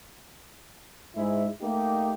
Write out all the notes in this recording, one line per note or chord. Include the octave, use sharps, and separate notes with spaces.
G#2 G#3 E4
A3 A#3 D#4 G4